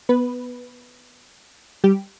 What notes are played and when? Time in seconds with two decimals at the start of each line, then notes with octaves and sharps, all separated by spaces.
0.09 B3 B4
1.84 G3 G4